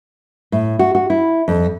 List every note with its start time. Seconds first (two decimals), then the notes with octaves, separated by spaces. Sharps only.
0.52 A2
0.79 F#4
0.95 F#4
1.10 E4
1.48 F2